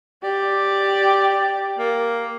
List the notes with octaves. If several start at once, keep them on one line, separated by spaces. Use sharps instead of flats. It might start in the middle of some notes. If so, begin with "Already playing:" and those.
G4 D5
A#3